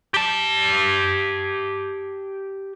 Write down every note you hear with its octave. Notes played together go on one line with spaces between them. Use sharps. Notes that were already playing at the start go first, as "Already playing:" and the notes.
G4 A5